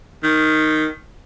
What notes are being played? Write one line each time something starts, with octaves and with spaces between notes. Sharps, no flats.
D#3